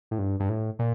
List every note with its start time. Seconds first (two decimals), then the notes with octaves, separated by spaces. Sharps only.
0.11 A2
0.19 G2
0.40 G2
0.49 A2
0.79 A#2